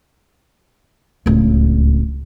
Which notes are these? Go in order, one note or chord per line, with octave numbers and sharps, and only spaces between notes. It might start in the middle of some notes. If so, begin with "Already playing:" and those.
D1 C#2